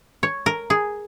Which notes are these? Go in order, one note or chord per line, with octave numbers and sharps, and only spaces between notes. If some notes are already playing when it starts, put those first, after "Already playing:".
C#5
A#4
G#4